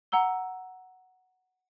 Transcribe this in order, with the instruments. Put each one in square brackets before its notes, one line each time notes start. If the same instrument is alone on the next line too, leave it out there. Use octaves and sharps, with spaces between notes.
[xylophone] F#5 A#5 E6 G7